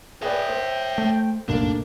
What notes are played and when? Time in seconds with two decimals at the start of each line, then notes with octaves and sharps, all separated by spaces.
0.22 G#4 B4 C#5 D5 E5 G5
0.48 C5
0.98 A3
1.49 C2 F#2 A#2 A3 A#3 D4 D#4